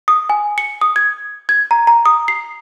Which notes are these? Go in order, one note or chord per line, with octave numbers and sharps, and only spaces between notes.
D#6
G#5
C#7
D#6
G#6
G#6
A#5
A#5
D#6
C7